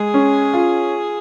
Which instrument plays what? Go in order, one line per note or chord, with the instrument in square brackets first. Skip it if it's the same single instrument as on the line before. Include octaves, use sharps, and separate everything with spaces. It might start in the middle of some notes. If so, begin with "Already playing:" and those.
Already playing: [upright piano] G#3 [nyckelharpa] G#4
[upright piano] C#4
F4